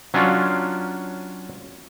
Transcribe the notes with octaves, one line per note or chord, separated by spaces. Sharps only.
F#3 C#4 D4 F4